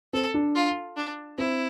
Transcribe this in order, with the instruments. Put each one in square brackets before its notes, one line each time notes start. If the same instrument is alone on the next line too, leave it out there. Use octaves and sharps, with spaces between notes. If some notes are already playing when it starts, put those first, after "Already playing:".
[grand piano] C4 [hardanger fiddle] A4
[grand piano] D4
[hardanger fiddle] F4
D4
[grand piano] C4 [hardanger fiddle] E4